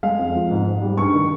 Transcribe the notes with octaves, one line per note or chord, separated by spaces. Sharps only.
G#3 F5
F2
F3
G#2
G#2
G3
G2 C#6
D#3